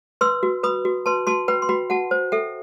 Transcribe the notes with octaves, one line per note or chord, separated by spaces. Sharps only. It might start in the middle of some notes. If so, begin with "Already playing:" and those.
B4 C6 E6
F#4
B4 B5 D#6
F#4
B4 A5 C6
F#4 A5 C6
B4 G5 B5
C6
F#4 G5 B5
F#4 F#5 A5
C5
A4 E5 G5